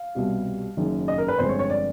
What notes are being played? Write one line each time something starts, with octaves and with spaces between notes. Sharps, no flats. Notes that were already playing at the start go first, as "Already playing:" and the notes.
Already playing: F5
C2 B2 G3
F#1 F#2 D#3
D#5
A#4
B4
G1 F2 D3 F3 G#3 C5
C#5
C#5
D5